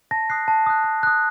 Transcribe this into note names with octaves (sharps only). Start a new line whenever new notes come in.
A5 A#6
D#6 F#6 C7
A5
D#6 F#6
A5
D#6 F#6